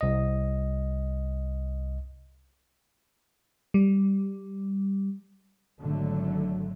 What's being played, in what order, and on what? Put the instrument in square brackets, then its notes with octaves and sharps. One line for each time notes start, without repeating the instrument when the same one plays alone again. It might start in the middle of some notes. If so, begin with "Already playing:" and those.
[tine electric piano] C2 D#5
[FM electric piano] G3
[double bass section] G#1 D3 F#3 A3